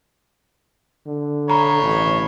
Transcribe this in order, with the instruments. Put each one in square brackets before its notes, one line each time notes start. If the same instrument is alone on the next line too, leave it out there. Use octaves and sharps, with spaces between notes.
[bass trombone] D3
[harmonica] C#5 B5 [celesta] A#5
[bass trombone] A1